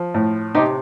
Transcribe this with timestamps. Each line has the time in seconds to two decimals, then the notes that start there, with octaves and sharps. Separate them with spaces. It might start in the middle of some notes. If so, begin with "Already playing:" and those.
Already playing: F3
0.14 A2
0.55 C3 D#4 G4